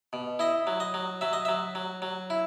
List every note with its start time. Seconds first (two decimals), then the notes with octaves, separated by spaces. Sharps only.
0.13 B2
0.39 E4 D#5
0.67 F#3
0.80 D#5
0.94 F#3
1.21 F#3 E5
1.33 D#5
1.45 E5
1.48 F#3
1.75 F#3
2.02 F#3
2.30 E4